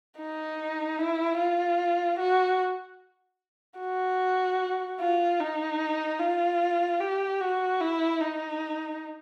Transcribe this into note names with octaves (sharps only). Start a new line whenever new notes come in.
D#4
E4
F4
F#4
F#4
F4
D#4
F4
G4
F#4
E4
D#4